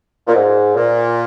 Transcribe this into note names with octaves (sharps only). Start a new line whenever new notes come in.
A#2
G#2
A#2